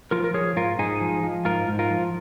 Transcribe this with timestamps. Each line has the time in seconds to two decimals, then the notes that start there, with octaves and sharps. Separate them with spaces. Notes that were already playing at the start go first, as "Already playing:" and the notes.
0.11 F3 F4 A#4
0.24 A#4
0.34 F3 G#4 C#5
0.56 G#2 F4 A#4
0.79 G#2 D#4 G#4
1.01 F3
1.23 F3
1.45 G#2 F4 A#4
1.68 G#2
1.79 F4 A#4
1.90 F3